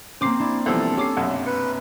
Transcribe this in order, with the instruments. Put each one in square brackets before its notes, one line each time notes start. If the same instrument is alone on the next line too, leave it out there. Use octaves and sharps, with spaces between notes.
[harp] A#3 C4 [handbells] C#4 D6 C7
[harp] D4 [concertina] E4
[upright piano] C2 E3 F3 [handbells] B3 [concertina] A4
[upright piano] C#4 [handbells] G4 D6 C7
[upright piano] F1 B1 F#2 [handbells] F#5 G#6
[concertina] B4 [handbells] C#7